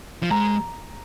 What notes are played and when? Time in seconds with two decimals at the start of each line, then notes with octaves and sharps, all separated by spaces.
0.23 F3
0.31 G#3 A#5